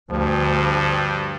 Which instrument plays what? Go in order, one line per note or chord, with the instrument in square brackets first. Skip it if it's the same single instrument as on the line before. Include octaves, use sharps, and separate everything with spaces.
[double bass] D2 [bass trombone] G2 [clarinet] F3